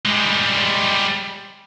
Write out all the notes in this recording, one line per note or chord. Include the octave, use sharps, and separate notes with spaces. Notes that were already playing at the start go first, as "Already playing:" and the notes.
G3 G#3